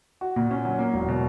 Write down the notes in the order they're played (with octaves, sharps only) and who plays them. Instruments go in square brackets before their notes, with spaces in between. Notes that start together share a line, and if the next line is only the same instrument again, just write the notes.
[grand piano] F#4
A#2
C#4
F#3
A#3
E1
B2